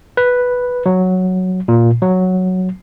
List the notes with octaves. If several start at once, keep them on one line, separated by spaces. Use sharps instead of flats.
B4
F#3
A#2
F#3